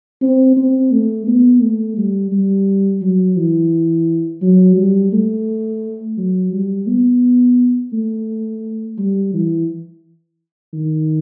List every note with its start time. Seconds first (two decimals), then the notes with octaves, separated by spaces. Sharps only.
0.22 C4
0.57 C4
0.92 A3
1.27 B3
1.61 A3
1.97 G3
2.32 G3
3.02 F#3
3.37 E3
4.42 F#3
4.77 G3
5.12 A3
6.17 F#3
6.53 G3
6.87 B3
7.93 A3
8.98 G3
9.34 E3
10.73 D#3